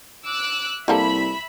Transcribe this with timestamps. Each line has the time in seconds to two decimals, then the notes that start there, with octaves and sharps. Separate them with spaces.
0.23 D6 E6 F#6
0.88 C2 G3 A#3 A4 E5 B5